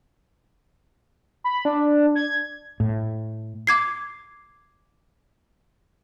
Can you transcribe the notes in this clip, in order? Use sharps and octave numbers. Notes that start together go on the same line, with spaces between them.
B5
D4
G#6
A2
D6 G#6 C7